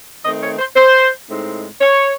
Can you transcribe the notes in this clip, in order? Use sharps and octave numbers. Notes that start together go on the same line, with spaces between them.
D#3 A3 C4 D#4 D#5
C#5
C5
C5
A2 G#3 C4 D#4
C#5